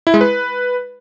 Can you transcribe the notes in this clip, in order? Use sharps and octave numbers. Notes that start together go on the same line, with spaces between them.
E4
G#3
B4